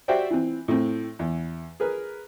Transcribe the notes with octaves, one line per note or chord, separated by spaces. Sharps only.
F#4 G4 C5 D5 E5 G5
E3 C4
A2 C4
E2
G#4 A#4 B4